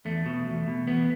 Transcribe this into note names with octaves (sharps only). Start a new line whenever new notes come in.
E2 A3
B2
E2
B2
E2 B3